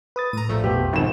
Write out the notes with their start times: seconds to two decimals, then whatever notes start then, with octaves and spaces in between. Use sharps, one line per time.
0.16 B4 D#6 A6
0.33 A2 A#5 D#7
0.49 A#1 F3 A3
0.64 F2 B2 B3 G4
0.93 G#1 B2 D#3 F3 C4 E7